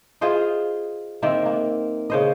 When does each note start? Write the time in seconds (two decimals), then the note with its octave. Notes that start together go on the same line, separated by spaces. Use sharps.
0.21 F4 G#4 C5 D#5
1.22 D#3 A#3 C4 E5
1.46 A#3
2.10 C#3 C5 D#5